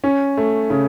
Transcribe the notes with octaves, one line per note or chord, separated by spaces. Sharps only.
C#4
A3
C#3